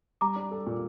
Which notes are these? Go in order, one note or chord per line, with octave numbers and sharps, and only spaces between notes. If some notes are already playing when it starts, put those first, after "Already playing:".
G3 A#5 D6
D4
A4
A#2